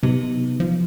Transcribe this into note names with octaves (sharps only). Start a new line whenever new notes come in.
C3 F#3 B3 D#4
F3